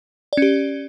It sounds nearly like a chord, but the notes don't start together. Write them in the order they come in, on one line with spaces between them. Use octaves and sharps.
D5 C#4 G4